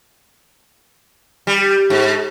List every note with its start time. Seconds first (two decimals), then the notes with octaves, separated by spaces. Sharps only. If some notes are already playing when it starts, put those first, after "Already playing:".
1.47 G3
1.90 G#2